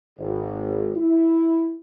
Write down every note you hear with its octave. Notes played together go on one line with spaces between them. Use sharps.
G#1
E4